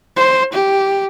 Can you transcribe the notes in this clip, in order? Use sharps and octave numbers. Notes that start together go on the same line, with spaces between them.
C5
G4